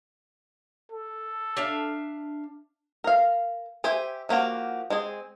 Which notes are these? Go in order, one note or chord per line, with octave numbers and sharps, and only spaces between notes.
A4
D4 E5 F5
A#4 F5
G4 C5 E5 G#5
F3 A#3 F#4 G4
G#3 C4 G#4